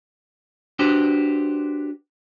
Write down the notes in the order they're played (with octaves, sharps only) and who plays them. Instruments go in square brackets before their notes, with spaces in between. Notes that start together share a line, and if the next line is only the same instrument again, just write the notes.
[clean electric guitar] D4 F#4 G4 B4 C5